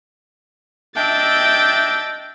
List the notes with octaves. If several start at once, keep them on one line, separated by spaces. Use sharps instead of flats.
D4 D#5 E5 G5 A6